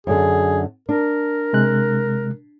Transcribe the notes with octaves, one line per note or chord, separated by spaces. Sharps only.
F#2 D3 G#4
D4 A#4
C3 G#3 F#6